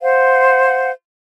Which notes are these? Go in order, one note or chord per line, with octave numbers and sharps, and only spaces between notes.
C5 F5 F#5